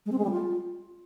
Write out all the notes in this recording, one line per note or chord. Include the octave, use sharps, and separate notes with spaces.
G#3
C4
G#3
G3
F4